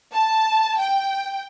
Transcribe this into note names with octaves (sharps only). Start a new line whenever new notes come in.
A5
G5